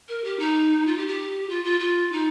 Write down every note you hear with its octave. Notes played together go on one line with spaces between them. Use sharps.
A#4
G4
D#4
F4
G4
G4
F4
F4
F4
D#4